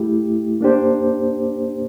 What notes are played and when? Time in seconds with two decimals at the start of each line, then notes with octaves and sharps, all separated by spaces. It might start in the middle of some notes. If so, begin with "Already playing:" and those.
Already playing: A3 E4 G4
0.61 A#3 D4 G4 C5